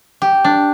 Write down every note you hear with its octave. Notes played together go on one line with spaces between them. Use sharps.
G4
D4